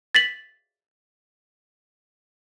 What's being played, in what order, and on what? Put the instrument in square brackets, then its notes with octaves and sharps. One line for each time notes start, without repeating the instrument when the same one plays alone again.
[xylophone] A6 B6 F#7